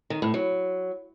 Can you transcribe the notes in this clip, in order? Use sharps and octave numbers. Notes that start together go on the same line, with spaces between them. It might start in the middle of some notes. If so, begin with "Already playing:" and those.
D#3
A2
F#3